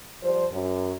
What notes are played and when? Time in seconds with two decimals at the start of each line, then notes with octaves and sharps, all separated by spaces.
0.23 F3 G3 C5
0.52 F#2